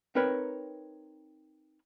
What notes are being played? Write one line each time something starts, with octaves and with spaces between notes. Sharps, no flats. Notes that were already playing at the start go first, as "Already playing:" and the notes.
C4 D#4 A#4 B4 C#5